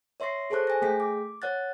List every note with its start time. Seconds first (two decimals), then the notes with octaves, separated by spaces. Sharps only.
0.20 C#5 E5 C6 C#6 A#6 C7
0.50 G#4 A4 C5 A5 C#6 F#6
0.67 G#5 A#6
0.82 A3 G#4 G5 B6
1.00 D6
1.42 C#5 F#5 F#6 A6